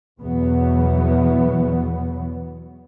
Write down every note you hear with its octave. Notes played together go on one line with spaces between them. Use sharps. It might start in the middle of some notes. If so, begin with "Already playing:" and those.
E2 B2 E3 F#3 B3